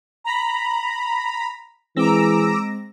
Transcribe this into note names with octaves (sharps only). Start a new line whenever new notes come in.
A#5 B5
E3 G#3 C4 G#4 A#5 D6 E6 A#6